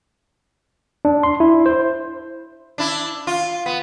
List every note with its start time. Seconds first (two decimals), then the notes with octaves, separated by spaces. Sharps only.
1.05 D4
1.23 C6
1.40 E4
1.66 C5
2.78 D4 E4
3.27 F4
3.66 B3